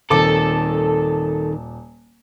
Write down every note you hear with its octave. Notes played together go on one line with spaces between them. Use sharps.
D#1 D#3 C4 A4 A5 D6